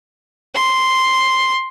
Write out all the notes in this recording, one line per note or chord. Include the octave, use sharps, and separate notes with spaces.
C6